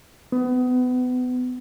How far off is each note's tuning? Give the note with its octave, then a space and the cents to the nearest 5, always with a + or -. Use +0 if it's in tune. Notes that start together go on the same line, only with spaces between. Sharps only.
B3 +30